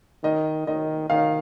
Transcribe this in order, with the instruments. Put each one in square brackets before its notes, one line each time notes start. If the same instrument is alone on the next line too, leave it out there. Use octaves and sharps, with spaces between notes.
[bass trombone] D#3 [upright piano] D#5
[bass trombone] D#3 [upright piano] D#5
[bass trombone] D#3 [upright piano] F5